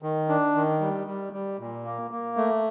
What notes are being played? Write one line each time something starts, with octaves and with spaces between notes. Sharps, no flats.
D#3
D4
D#3
G3
G3
G3
A#2
A#3
A#3
A3